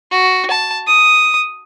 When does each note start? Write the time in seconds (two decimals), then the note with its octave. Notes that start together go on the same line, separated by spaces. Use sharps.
0.11 F#4
0.50 A5
0.87 D#6